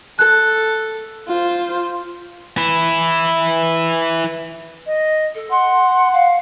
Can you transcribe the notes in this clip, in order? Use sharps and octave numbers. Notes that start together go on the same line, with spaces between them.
A4 F#6
F4 C5
E3 E4
D#5
A4
F#5 C6
F5